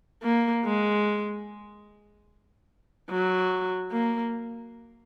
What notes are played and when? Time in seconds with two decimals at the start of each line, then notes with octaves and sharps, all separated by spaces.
0.23 A#3
0.64 G#3
3.10 F#3
3.92 A#3